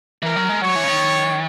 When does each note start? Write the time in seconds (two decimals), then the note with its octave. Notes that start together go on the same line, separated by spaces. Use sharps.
0.22 E3 A#4
0.36 F#3
0.49 G#3
0.61 F#3 C#5
0.76 E3
0.84 C#3
0.87 D#3